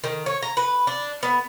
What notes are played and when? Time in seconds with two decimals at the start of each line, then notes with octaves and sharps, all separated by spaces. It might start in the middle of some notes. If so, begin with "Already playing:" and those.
0.04 D#3
0.26 C#5
0.42 A#5
0.57 B4
0.87 D4
1.23 B3